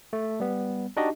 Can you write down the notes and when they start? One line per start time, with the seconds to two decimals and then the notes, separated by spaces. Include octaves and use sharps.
0.13 A3
0.40 G3 B3
0.97 D4 D#4 F#4 G4 D#5